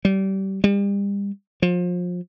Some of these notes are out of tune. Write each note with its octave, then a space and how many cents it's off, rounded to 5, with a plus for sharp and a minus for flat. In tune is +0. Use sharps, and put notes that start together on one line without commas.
G3 -25
G3 +35
F3 +30